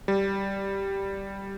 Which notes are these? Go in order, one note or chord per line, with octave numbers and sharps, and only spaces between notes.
G3